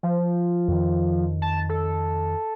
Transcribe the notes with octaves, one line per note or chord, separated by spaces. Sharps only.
F3
F2 D#3
A5
A4